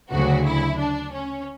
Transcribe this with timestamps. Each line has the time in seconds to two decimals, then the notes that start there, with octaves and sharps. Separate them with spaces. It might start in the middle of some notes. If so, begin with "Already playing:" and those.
0.11 D2 C#3 F#3 F#4
0.45 E4
0.77 D4
1.12 C#4